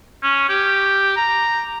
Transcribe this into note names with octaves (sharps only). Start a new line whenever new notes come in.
C#4
G4
A#5